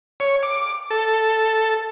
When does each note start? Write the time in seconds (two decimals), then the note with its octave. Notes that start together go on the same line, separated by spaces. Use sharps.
0.20 C#5
0.43 D6
0.90 A4